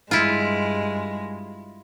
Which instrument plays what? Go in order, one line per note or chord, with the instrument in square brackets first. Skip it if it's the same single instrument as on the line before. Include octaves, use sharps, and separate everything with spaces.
[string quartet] G2 G#3 [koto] E4 F4